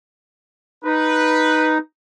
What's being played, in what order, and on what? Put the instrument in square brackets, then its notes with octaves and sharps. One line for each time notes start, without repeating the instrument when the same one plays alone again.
[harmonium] D#4 [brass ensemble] B4